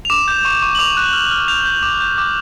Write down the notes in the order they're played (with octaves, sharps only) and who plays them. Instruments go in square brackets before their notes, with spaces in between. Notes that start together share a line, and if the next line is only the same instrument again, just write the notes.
[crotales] F7
D6 E7
G6
C#6
C#6
F#7
D6 F7
F#6
F6
F6
G6 F7
G6
D6
G6
D6